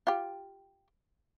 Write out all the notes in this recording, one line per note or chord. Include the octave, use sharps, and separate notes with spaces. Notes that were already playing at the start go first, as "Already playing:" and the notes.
F4 G4